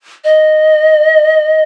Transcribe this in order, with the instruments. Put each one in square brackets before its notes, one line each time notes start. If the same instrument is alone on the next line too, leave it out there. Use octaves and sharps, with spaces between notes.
[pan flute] D#5